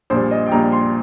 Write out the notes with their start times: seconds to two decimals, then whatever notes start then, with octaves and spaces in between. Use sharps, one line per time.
0.10 A#1 A#2 G3 C5
0.31 D#5
0.47 G5
0.51 A#1 A#2 G3 A#5
0.72 C6